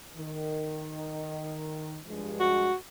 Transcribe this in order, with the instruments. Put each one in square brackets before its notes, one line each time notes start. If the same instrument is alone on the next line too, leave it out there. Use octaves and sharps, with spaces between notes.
[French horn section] D#3
G2 F3 G#3
[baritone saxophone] F#4